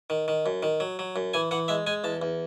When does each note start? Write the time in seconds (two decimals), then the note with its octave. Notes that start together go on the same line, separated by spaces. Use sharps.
0.10 D#3
0.28 D#3
0.46 F#2
0.63 D#3
0.80 F#3
0.99 F#3
1.16 F#2
1.34 E3 G#5
1.51 E3 F#5
1.68 G#3 E5
1.87 G#3 G#5
2.04 E2 A5
2.22 E2